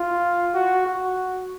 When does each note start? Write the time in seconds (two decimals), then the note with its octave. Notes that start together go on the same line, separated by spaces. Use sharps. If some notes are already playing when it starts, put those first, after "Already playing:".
Already playing: F4
0.54 F#4
0.86 F#4